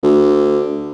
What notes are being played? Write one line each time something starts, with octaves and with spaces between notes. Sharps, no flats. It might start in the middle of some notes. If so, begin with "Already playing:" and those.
D2